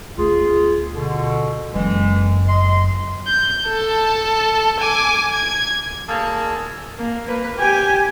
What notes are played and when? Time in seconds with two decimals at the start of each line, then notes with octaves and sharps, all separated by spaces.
0.18 D2 B3 F4 G#4
0.95 B2 D3
1.73 F#1 F#2 E3 G#3
2.48 D#5 C6
3.27 G6
3.68 A4 A5
4.80 G#5 D6
5.32 G#6
6.08 B2 D3 A#3 G#4 A5 E6
6.98 A#3
7.28 A#3 B4
7.59 G4 G#5